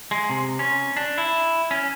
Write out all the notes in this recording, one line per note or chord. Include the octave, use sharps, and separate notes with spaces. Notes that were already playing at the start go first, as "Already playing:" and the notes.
G#3
C3
C#4
D4
E4
C#4